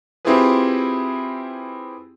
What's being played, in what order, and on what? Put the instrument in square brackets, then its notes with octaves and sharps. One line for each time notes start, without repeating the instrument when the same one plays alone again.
[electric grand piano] C4 E4 F4 G4 G#4 B4